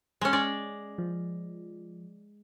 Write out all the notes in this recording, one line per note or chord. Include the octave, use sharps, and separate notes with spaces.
G#3 C#4
G#3 C#4 D5
F3